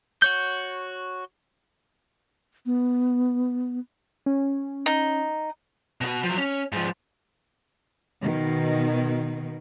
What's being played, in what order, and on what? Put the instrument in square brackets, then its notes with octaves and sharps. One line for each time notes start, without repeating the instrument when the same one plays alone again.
[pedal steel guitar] F#4 C#5 G6
[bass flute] B3
[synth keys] C#4
[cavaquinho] D#4
[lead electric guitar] B2 F#4
F3 F#3
C#4
G#2 F3
[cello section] B2 D#3